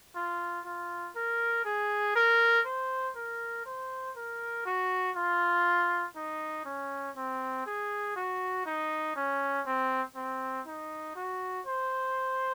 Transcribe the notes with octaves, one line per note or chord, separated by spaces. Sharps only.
F4
F4
A#4
G#4
A#4
C5
A#4
C5
A#4
F#4
F4
D#4
C#4
C4
G#4
F#4
D#4
C#4
C4
C4
D#4
F#4
C5